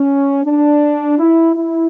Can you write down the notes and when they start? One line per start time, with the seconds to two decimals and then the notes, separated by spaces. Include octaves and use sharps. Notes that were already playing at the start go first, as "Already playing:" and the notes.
Already playing: C#4
0.45 D4
1.19 E4
1.55 E4